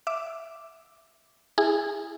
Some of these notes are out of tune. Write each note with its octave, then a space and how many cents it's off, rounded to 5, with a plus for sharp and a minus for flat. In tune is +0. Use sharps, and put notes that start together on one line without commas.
E5 +0 D6 +0
E4 +0 G#4 -20